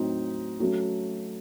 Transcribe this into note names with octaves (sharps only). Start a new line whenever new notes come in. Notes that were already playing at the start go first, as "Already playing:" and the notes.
Already playing: A2 F#3 C4 D#4
F#3 A3 C#4 F#4 A4